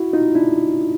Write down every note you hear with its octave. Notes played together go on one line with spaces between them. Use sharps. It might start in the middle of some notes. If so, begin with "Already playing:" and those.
Already playing: E4 F#4
D#4 F4
D4 E4